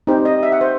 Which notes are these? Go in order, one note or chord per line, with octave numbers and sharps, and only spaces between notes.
C4 D#4 G4 C5
D#5
E5
F#5
C5